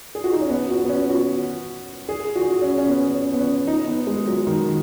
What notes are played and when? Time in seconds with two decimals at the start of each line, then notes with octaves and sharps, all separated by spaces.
0.15 G#4
0.24 F#4
0.33 D#4
0.41 C#4
0.50 B3
0.70 F#4
0.84 B3
0.89 C#4
1.09 F#4
2.09 G#4
2.35 F#4
2.42 G#4
2.50 F#4
2.62 C#4
2.78 C#4
2.88 B3
3.15 C#4
3.33 B3
3.40 C#4
3.67 D#4
3.87 B3
4.07 G#3
4.27 F#3
4.47 D#3